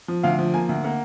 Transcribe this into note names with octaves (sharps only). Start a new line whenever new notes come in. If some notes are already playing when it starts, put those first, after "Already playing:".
F3
D2 F5
F3
A#3 G#5
D2
A#3 F#5